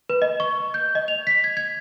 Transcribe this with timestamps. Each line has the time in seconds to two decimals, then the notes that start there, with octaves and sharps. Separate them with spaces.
0.10 B4
0.22 D#5
0.40 C#6
0.74 G6
0.95 D#5
1.08 F7
1.27 B6
1.44 G#6
1.57 G#6